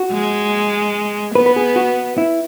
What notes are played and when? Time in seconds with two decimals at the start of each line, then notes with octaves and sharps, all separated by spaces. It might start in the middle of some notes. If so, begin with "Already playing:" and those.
Already playing: F#4
0.12 G#3
1.35 B3 B4
1.46 B4
1.56 G#4
1.76 F#4
2.18 E4